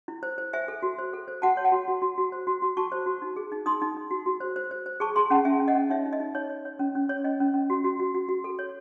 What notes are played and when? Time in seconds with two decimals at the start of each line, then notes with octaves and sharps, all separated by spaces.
0.08 E4
0.23 C5
0.38 C5
0.53 C5 E5 G#5
0.68 A4
0.83 F#4
0.98 C5
1.13 A4
1.28 C5
1.42 F#4 F#5 A5
1.57 C#5
1.65 F#5 A5
1.72 F#4
1.88 F#4
2.02 F#4
2.18 F#4
2.32 C5
2.47 F#4
2.62 F#4
2.77 F#4 A5 C#6
2.92 C5
3.06 F#4
3.22 D#4
3.36 G#4
3.52 D#4
3.66 D#4 C6 D#6
3.82 D#4
3.97 D#4
4.11 F#4
4.26 F#4
4.40 C5
4.56 C5
4.71 C5
4.86 C5
5.00 G#4 A5 C#6
5.16 G#4 G#5 C6
5.30 C#4 F#5 A5
5.45 C#4 E5 G#5
5.60 C#4
5.68 D#5 F#5
5.75 C#4
5.90 D#4 C#5 E5
6.06 D#4
6.13 D#5
6.20 D#4
6.35 D#4 C#5
6.49 C#5
6.65 C#5
6.79 C#4
6.95 C#4
7.09 C#5
7.24 C#4 D#5
7.40 C#4
7.54 C#4
7.70 F#4
7.84 F#4
8.00 F#4
8.14 F#4
8.29 F#4
8.44 A4
8.59 C#5